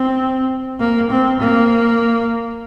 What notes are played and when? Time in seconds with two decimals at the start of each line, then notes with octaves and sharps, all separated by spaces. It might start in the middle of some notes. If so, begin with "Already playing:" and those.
Already playing: C4
0.80 A#3
1.10 C4
1.39 A#3